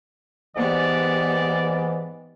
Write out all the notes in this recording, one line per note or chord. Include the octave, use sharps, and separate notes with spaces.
G#2 E3 B3 G4 D5